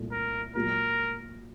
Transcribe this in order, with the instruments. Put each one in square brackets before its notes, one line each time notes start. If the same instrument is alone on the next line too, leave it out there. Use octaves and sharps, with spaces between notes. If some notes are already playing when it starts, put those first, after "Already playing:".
Already playing: [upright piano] C2 A#2 A3
[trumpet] A#4
[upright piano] A#2 F#3 A#3 F4 [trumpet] A#4